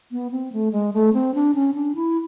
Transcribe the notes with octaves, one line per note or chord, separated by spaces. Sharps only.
B3
C4
A3
G#3
A3
C4
D4
C#4
D4
E4